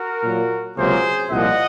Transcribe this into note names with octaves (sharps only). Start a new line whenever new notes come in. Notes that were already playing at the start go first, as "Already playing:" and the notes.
Already playing: F#4 A#4
A#2 F#3 A#3
C#2 C3 F#3 A#3 G#4 C5
C2 A#2 F3 D#5 F#5